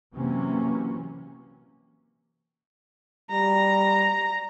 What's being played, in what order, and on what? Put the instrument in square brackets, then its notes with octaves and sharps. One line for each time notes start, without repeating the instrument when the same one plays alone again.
[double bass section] C3 E3 F#3 A#3 C#4
[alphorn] G3 [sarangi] A#5